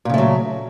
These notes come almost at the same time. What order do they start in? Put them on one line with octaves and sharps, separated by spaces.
A#2 C#3 A3 F#3